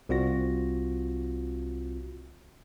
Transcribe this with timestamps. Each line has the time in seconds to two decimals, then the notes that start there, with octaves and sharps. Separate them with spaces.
0.09 C2 C4 F4 F#4 A#6